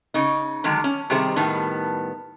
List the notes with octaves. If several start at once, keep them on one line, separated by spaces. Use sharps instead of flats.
C#3 D#4
D3 D#3 F#3 G#3
C#4
C3 D#3 G3 G#4 C5
A2 D#3 G3 B3